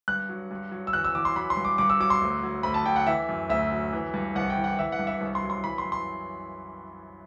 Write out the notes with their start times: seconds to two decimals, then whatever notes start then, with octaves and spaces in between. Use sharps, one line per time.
0.08 G2 F#6
0.29 F#3
0.51 G2
0.71 F#3
0.87 E6
0.93 E2 F#6
1.04 E6
1.15 E3 D6
1.25 C6
1.36 F#3 B5
1.50 C6
1.57 G2
1.65 D6
1.78 G2 D6
1.90 E6
2.00 F#3 D6
2.10 C6
2.22 D2
2.43 F#3
2.63 D2 B5
2.74 A5
2.86 F#3 G5
2.96 F#5
3.07 E3 E5
3.29 F#2
3.50 D2 E5
3.72 F#3
3.93 E3
4.14 G2
4.35 C2 F#5
4.50 G5
4.57 E3
4.64 F#5
4.79 E3 E5
4.92 F#5
4.99 G2
5.07 E5
5.21 C2
5.35 C6
5.42 F#3
5.50 C6
5.64 E3 B5
5.78 C6
5.85 F#2
5.92 C6